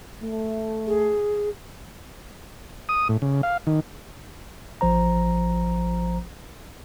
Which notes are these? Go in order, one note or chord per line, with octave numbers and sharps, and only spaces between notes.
A3
G#4
D#6
A2
C#3
F5
D#3
A1 F3 C5 A#5